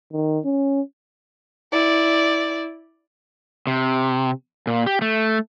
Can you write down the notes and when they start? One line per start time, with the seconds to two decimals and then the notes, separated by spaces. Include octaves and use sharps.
0.13 D#3
0.45 C#4
1.72 E4 D5
3.67 C3
4.67 A#2
4.86 G4
5.02 A3